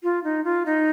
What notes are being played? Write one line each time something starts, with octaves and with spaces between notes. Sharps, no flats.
F4
D#4
F4
D#4